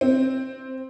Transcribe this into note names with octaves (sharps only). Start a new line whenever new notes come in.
C4